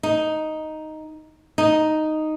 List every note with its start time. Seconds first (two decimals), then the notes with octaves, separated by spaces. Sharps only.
0.03 D#4
1.58 D#4